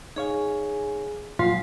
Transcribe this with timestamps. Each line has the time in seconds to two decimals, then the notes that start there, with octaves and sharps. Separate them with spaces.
0.16 D#4 G#4 C#5 F5 G#5
1.39 A#2 F3 F#3 G#3 F4 F5 C6